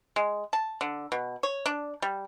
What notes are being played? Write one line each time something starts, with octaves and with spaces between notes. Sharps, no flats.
G#3
A5
D3
B2
C#5
D4
G3